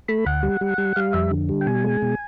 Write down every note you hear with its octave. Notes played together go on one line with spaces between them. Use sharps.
A3 B5
D2 F#5
G3
G3
G3
G3 F5
F2 E5
D3
G3
G5
B2 G#5
G#3
B2